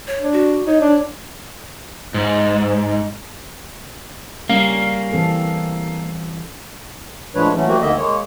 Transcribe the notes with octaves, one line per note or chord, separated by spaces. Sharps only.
C#5
D4
F#4
D#4 C#5
D4
G#2
G3 A#3 C#4 F5
E3 C4 A4
A2 F3 G#3 D4 B4 C#5
E3 F#3 A3 C#4
F3 G3 A3 A#3 C4 F#4
D2 D3 D#3 A#3 D#5 E5
G#3 A#3 C#5